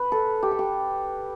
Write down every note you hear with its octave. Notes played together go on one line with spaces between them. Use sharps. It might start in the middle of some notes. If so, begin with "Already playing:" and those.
Already playing: B4
A4
G4
A4
G4